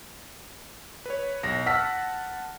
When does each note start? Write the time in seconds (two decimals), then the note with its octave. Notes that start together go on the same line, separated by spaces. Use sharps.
1.06 B4 C#5
1.43 B1 A#6
1.66 F#5 A5 E6 F6 B6